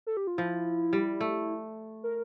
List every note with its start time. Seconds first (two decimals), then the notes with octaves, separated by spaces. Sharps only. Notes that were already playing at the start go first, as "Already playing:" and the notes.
0.07 A4
0.17 G4
0.27 F4
0.38 F3 E4
0.93 G3
1.21 A3
2.03 A#4